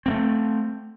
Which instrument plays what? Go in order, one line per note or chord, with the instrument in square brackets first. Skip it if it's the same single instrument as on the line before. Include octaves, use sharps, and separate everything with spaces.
[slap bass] A3 A#3 C4